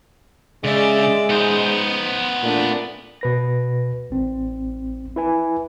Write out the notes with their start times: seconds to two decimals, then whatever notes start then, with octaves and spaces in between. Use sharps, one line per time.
0.64 C#3 G#3 D5 E5
1.30 B3 D#4 C5
2.42 A#2 A3 D4
3.21 B2 B4 A#6
4.10 A1 C4
5.16 E4 B4 G#5